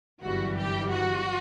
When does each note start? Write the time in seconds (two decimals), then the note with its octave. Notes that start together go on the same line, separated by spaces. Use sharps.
0.23 G1 F#2 E3 G3 F#4
0.57 G4
0.90 F#4